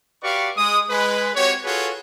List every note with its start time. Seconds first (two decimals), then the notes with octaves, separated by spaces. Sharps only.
0.23 F#4 G4 B4 D5 F5 C#6
0.56 G#3 D#6
0.90 G#3 B4
1.35 C4 F#4 G4 C#5
1.65 F4 F#4 G#4 A4 B4 C#5